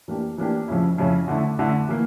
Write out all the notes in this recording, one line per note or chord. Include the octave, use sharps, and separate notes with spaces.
E3 A#3 D4 G4
E3 A#3 D4 G4
F2 C#3 F3 C#4 E4
F2 C#3 F3 C#4 E4
D3 A3 E4
D3 A3 E4
E3 A#3